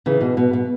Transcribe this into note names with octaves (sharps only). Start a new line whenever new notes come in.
C#3 E3
B2
B2
B2